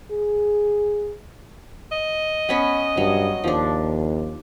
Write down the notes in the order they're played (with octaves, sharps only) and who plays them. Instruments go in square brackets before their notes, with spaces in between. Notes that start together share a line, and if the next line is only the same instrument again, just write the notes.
[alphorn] G#4
[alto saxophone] D#5
[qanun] B3 C#4 B4
[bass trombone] G2 [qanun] F#3
[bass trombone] D#2 [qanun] F3 D4